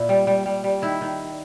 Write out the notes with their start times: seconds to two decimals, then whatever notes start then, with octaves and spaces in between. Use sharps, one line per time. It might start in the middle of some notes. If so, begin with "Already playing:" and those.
Already playing: A#2 E4
0.09 G3
0.27 G3
0.46 G3
0.64 G3
0.82 D#3 E4
1.01 D#3